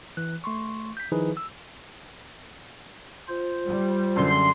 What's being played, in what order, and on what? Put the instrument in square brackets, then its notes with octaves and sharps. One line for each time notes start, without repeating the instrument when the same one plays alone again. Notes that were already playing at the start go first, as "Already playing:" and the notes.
[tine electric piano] E3 F#6
A3 C6 C#6
G6 B6
D#3 F3 D#4 E4 G#4 B4
E6
[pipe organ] F4 C5
[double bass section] G3
[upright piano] F#2 D3 [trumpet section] C6